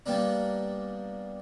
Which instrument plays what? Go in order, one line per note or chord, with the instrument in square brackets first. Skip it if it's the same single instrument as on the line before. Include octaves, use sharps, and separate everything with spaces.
[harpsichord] G3 A#3 B3 D4